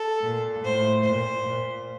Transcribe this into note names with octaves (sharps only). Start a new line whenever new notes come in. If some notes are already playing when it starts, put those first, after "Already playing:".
Already playing: A4
A#2
A2 C5
A#2 C5
A#2